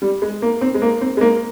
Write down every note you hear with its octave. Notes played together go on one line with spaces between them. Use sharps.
G3
G#3
A#3
C4
G#3
A#3
C4
G#3
A#3